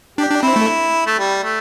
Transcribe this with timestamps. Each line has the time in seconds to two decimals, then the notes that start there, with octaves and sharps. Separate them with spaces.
0.18 D4 G4
0.30 D4
0.43 C4 E4
0.56 A3
1.06 A3
1.19 G3
1.43 A3